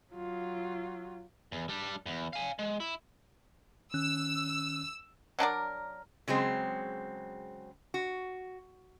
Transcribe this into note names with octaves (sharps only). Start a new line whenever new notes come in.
F#3 F4
E2
G3 D4
E2
F5 G#5
G#3
E4
D#3 C#4 E6 F#6
F#3 D4 A#4 D5
C#3 F#3 G#3 C4
F#4